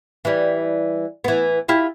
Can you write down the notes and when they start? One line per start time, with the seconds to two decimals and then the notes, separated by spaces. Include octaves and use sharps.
0.25 E3 G3
1.24 E3 B3
1.68 E4 F4 G4